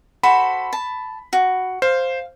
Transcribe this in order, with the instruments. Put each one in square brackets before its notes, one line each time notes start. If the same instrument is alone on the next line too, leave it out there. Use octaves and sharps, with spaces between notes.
[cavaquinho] F#4 A4 C5 [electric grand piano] B5
[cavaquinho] A5
F#4
[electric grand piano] C5 [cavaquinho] F5